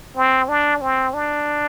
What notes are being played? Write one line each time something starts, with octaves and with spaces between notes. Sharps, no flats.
C4
D4
C4
D4